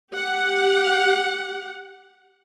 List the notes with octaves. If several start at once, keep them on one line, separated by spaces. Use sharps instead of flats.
G4 F#5